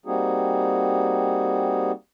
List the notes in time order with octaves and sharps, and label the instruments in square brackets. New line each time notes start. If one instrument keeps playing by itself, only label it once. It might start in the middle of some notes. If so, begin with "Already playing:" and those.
[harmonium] G3 A#3 C4 D#4 F#4 G#4